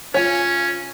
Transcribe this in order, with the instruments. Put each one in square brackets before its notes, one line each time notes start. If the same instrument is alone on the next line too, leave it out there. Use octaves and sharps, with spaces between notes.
[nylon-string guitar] C#3 F4 [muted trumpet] C#4 [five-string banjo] C#5 G#5